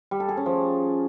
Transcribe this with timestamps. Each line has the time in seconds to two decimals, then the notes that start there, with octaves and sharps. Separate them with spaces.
0.11 G3
0.20 A4
0.29 G#4
0.37 C#4
0.46 F3